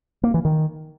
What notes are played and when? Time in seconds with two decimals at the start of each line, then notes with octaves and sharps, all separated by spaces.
0.23 A#3
0.34 E3
0.45 D#3